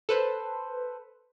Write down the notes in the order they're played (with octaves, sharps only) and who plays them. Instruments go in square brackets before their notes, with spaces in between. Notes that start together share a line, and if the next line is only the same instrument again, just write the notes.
[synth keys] A4 B4 C5